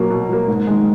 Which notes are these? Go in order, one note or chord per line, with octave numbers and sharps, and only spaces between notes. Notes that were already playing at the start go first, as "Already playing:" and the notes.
Already playing: B2 F#3 A#3
B2
F#3 A#3
G#2
D#3 G#3